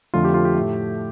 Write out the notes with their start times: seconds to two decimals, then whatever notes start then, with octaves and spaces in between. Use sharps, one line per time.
0.14 F2 D3 F3 A3 F4
0.25 G4
0.34 F4
0.45 G4
0.55 A2 A3